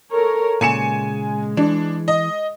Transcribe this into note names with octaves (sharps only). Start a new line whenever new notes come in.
A4 A#4 C#5
A#2 C#3 G#3 G#5 C#7 E7
E3 D4
D#5